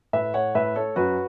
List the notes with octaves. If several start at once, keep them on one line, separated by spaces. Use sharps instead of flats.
A2 B4 E5
A3 C#5 F#5
A2 B4 E5
A3 A4 C#5
F#2 F#4 B4